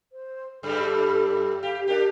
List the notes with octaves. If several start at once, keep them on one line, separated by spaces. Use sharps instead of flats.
C5
F#2 G3 A4
G4 F5
D4 G4 A#4